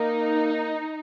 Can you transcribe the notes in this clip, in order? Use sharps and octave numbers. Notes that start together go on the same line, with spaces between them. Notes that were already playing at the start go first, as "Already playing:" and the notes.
Already playing: A#3 D#4